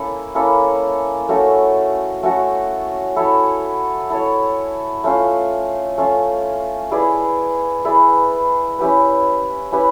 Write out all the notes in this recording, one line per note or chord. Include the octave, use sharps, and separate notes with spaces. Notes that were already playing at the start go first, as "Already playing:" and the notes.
Already playing: A#3 C#4 E4 A4
A#3 C#4 E4 A4
A3 C#4 F#4 A4
A3 C#4 F#4 A4
E4 A4 C#5
E4 A4 C#5
A3 C#4 F4
A3 C#4 F4
E4 G#4 B4 D5
E4 G#4 B4 D5
C#4 E4 G4 B4
C#4 E4 G4 B4